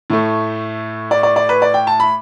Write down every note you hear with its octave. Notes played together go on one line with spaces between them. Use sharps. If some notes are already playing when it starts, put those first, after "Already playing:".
A2 A3
D5
D5
D5
B4
D5
G5
A5
B5